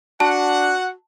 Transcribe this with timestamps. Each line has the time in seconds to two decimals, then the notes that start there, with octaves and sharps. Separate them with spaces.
0.20 D4 F#4 F#5 A5